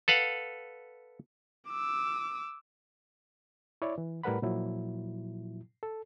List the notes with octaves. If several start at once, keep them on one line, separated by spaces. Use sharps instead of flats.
A4 B4 F5 F#5
D6 E6
E4 C#5 D5
E3
A2 G3 A#4 B4 F#5 B5
A#2 F3 F#3 E4
A4